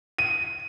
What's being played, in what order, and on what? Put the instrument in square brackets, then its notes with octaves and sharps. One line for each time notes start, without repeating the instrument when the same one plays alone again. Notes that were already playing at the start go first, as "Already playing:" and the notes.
[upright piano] D#7